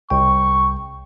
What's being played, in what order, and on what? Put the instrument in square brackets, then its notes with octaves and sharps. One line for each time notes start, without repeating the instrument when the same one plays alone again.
[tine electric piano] C2 G5 [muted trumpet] C#6